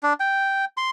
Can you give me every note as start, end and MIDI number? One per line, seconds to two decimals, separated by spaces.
0.03 0.13 62
0.20 0.65 79
0.77 0.90 84